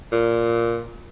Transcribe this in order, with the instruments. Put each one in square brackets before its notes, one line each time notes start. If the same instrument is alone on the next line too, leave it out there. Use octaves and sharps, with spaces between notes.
[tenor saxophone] A#2